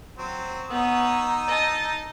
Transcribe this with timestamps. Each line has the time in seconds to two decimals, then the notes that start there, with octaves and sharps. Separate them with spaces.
0.18 F#3 C4
0.70 B3 D#4 C#5 D#6 E6
1.48 D#5 A5